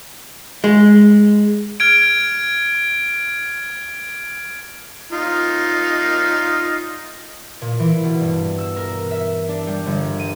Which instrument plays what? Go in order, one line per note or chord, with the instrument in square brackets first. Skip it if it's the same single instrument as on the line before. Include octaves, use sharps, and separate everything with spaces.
[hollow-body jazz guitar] G#3
[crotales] F6 G#6 D7
[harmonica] D#4 F4
[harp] A#2
E3
B2
G2
E6
A#4
E5
D4
G3
G1
D#7